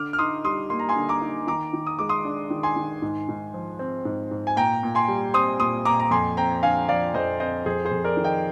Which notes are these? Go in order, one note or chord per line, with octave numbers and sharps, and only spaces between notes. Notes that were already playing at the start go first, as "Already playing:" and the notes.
Already playing: D3 D6 F6
F6
D#4 C6 D#6
G3 C6 D#6
A#3 C6
A#5
G#5 C6
D3
A#5 D6
D#4
D#3 A#5 D6
D#3
D#6
G#3 D6
C6 D#6
D4
D#3
G#5 C6
D#3
G#2
G#2
F3
C4
G#2
G#2
G#5
A#2 G5 A#5
A#2
G#5 C6
G3
C4 C6 D#6
A#2 C6 D#6
A#2 A#5 D6
A#5
F2 G#5 C6
C4 G5 A#5
D3 F5 G#5
F3 D5 F5
F2 C5 D#5
C4 C5 D#5
F2 G#4 C5
G#4 C5
F2
A#4 D5
D#3
D#5 G5